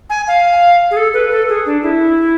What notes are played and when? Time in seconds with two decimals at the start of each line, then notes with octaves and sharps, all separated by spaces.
0.10 G#5
0.28 F5
0.91 G#4
0.97 A4
1.14 B4
1.31 A4
1.49 G#4
1.66 D4
1.83 E4